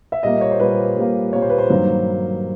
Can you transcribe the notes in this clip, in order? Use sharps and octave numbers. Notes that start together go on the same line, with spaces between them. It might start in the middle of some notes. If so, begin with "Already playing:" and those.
E5
A#2 G3 A#3 D#5
C#5
C5
A#2 G3 A#3 B4
A#2 G3 A#3
A#2 G3 A#3 C#5
C5
B4
C5
G2 D#3 F#3 A#3